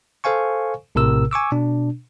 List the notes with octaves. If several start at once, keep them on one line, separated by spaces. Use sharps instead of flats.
A4 C5 F5 G#5 C#6
A#1 A2 C3 A#4 E6
G#5 C#6 D6 E6
B2 D4